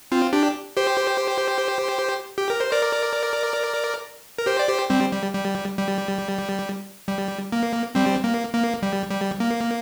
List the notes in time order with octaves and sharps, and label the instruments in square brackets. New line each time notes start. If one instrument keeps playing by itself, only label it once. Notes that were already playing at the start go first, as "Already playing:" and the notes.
[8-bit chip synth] C4 F4
D4 G4
G4 C5
G4
A#4
C5
A#4 D5
A#4
G4 C5
D5
G4 C5
G3 C4
G3
G3
G3
G3
A#3
G3 C4
A#3
A#3
G3
G3
A#3